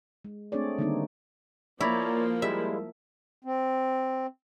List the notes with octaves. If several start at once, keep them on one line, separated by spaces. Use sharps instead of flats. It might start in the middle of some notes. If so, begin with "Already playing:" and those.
G#3
A3 C4 D4 G#4 C#5 D5
D3 D#3 G3 A#3 C4 D#4
F3 A#3 E4 C#5 D5 A#5
G3 G#3 E4 E5
C4